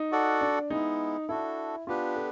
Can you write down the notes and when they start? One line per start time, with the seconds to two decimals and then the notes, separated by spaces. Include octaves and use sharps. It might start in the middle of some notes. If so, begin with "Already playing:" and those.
Already playing: D#4
0.11 F#4 A4 D5 F#5
0.41 D4
0.70 G#3 B3 D#4 E4
1.29 D4 E4 F#4 A4
1.87 B3 D4 F4 G4 B4
2.16 A4